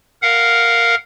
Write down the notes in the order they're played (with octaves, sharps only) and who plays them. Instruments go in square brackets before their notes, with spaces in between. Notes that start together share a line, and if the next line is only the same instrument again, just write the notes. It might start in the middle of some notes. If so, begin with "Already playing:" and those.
[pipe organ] A#4 F5 F#5